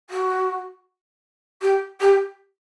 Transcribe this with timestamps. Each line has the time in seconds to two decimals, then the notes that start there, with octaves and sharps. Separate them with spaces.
0.10 F#4
1.61 G4
2.00 G4